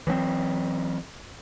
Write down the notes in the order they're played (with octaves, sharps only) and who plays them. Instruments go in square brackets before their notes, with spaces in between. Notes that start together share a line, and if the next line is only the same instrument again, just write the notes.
[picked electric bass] E3 F#3 B3 C4